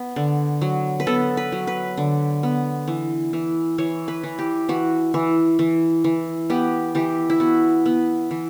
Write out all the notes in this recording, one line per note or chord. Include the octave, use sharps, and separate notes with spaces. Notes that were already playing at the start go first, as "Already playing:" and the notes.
Already playing: B3
D3
F#3
B4
B3 A4
B4
F#3
B4
D3
B3
E3
E3
E3 C#5
B4
E3
G4
E3 F#4
E3
E3
E3
B3 G4
E3 G4
E4
B3 F#4
B3
E3